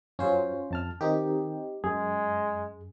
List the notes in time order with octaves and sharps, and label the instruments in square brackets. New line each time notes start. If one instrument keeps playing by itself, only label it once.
[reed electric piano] F#2 F#3 [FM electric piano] C#4 F4 C5
[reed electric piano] F2 A5 F6
[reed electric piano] D#3 [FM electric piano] C4 D#4 G4
[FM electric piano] F#2 [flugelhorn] G#3 [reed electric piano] G#4